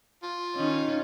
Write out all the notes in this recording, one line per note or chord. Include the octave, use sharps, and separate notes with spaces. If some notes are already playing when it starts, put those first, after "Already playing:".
F4
D#3 C#4 D#4